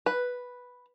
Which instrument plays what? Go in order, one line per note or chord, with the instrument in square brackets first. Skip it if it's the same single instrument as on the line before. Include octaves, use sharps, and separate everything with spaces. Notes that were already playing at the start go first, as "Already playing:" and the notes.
[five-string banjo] B4